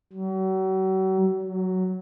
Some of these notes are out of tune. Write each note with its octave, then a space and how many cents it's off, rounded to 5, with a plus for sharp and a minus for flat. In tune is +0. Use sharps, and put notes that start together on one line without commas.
F#3 +40
F#3 +5